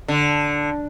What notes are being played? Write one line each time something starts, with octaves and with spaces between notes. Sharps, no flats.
D3